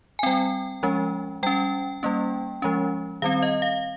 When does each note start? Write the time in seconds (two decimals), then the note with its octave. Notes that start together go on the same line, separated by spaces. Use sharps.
0.19 G#5
0.23 G3 C4 G5
0.83 F3 G#3 C#4
1.43 G3 C#4 G5
2.03 G3 A#3 C#4
2.62 F3 G#3 C#4
3.22 D#3 G3 C4 F5
3.42 D#5
3.62 F5